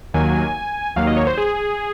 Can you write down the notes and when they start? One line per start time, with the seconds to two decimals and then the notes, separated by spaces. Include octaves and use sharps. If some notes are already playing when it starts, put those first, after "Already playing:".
0.14 D#2 D#3 F#3 A#3 G#5
0.96 D#2 D#3 F#3 A#3 F5
1.07 D#5
1.17 C#5
1.27 C5
1.38 G#4